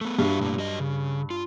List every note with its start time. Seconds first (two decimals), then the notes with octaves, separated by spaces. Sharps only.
0.01 A3 B3
0.19 G2 F#4 E5 F5
0.39 B2 A3 A#3
0.58 F#3 D#5
0.80 C#3
1.31 F4